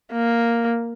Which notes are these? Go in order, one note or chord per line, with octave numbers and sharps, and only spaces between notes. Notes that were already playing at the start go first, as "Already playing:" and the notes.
A#3